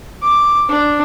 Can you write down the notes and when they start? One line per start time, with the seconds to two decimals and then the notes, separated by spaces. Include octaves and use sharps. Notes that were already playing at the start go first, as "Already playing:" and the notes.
0.23 D6
0.69 D4